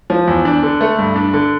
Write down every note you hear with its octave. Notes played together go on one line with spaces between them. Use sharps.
F3
E2
D4
D3
A3
G2
D4
D3